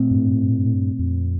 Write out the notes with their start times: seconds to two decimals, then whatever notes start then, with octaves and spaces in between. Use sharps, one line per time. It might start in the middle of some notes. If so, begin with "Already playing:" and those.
Already playing: A#2 A3 C4
0.11 G2
0.18 A2
0.27 G2
0.35 A2
0.43 G2
0.50 A2
0.59 G2
0.66 A2
0.74 G2
0.99 F2